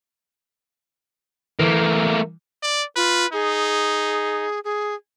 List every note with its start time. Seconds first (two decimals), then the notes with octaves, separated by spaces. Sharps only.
1.59 E3 A3 A#3
2.63 D5
2.96 F4 B4
3.33 D#4 G#4
4.64 G#4